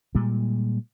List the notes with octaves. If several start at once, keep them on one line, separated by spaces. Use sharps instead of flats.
A#2 G3 G#3